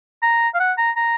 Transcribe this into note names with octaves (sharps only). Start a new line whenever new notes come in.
A#5
F5
F#5
A#5
A#5